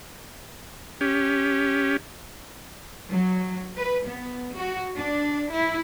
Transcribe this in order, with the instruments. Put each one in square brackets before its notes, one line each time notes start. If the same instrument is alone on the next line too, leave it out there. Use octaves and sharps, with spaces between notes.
[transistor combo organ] C#4 G4
[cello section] F#3
B4
B3
F#4
D4
E4